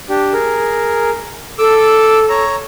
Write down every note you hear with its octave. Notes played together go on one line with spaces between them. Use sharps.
D4 G4
G#4 A#4
A4 D6 E6
C#5 A#5